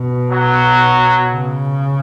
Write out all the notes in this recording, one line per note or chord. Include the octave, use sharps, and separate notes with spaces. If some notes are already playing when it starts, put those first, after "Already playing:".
Already playing: B2
F#3
C#3